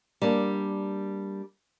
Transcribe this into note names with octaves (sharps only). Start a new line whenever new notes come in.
G3 A#3 D4